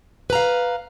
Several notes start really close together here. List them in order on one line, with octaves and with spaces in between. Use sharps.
B4 A#5 F5